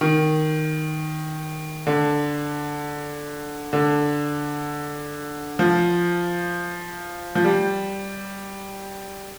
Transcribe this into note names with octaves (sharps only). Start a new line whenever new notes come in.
D#3
D3
D3
F3
F3
G3